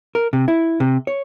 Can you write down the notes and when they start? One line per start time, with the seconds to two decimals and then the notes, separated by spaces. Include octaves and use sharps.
0.15 A#4
0.33 C3
0.48 E4
0.80 C3
1.07 C#5